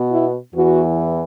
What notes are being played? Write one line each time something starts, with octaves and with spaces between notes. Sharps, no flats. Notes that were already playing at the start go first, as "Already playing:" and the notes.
Already playing: B2 B3
E4
E2 E3 B3 F#4